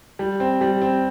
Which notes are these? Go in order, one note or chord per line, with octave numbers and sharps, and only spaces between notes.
G3
C4
G3
C4